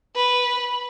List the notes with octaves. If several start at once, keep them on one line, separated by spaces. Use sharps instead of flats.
B4